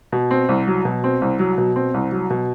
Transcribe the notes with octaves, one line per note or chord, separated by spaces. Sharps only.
B2
C4
C2
F#3
B2
C4
C2
F#3
B2
C4
C2
F#3
B2